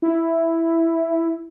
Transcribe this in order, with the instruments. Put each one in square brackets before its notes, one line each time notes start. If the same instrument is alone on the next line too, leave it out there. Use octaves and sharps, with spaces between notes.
[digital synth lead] E4